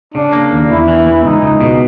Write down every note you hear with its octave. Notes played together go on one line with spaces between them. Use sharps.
C#3 D4
A#3
D#2
E2 E4
E3
E2
C#2 D#4
C#2
B2